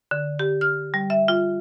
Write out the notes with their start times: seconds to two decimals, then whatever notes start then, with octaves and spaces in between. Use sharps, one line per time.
0.11 D3
0.39 G4
0.61 F6
0.94 G3
1.10 E5
1.28 F4